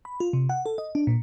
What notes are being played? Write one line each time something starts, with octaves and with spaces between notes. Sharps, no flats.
B5
F4
C3
F#5
A4
D#5
D4
A#2